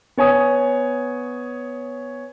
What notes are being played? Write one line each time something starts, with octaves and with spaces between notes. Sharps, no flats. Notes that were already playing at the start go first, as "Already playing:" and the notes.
B3 C#5 G#5 D#6